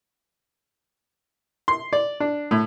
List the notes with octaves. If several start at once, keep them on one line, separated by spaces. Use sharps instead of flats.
C6
D5
D4
A2